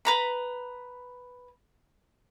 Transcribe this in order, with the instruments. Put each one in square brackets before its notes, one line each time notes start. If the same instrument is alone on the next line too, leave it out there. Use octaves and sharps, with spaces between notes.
[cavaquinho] B4 A#5 B5